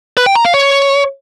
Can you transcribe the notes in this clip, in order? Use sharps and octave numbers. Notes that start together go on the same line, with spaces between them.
B4
G5
A#5
F5
C#5